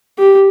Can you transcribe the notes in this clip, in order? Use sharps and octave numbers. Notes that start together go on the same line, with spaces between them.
G4